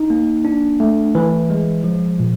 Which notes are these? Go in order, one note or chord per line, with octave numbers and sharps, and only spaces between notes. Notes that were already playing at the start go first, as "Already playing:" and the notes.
Already playing: D#4
A#3
D4
A3
E3
G#3
F3
A#2